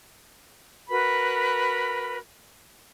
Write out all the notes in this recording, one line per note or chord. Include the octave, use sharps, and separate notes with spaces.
F#4 A#4 B4 B5